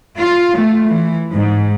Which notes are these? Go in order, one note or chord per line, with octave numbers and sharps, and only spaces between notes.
F4
A3
E3
G#2